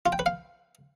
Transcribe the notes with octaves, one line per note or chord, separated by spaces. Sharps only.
F4
G5
B4
F5